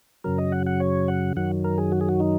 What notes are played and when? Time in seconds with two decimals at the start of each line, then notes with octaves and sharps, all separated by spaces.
0.24 F#2 C#3 F#3 A#4
0.38 D#5
0.52 F#5
0.67 F#5
0.80 C#5
1.08 F#5
1.36 F#2 D#3 F#3 F#5
1.64 A#4
1.78 G#4
1.92 F#4
2.01 G#4
2.09 F#4
2.20 D#4